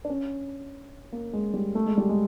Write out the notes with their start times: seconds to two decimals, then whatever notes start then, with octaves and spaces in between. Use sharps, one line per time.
0.05 D4
0.10 C#4
1.12 A#3
1.33 G#3
1.54 G3
1.75 A3
1.86 G#3
1.98 G3
2.09 G#3